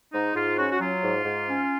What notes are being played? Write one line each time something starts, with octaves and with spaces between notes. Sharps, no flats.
G#2 D#4
G#2 F4
C#4 F#4
F#4
F#3 F4
G#2
G#2
C#4